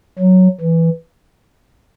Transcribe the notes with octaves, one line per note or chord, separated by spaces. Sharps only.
F#3
E3